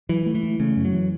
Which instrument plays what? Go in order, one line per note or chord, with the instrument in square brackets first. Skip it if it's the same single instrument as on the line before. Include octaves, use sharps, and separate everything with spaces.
[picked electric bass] E3 [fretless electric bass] F#3
[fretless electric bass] A3
[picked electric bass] E3
[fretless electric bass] A3
[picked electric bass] C#3 [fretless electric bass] A3
[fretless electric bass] F#2
[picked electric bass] F#3
[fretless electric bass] E3